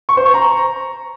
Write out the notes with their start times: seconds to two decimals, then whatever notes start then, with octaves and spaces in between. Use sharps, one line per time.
0.09 C#6
0.17 C5
0.26 C#6
0.34 A#5